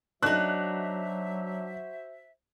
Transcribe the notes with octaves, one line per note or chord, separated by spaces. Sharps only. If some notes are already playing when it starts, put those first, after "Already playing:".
F#3 D4 D#4 F#4 C5 E5 F#6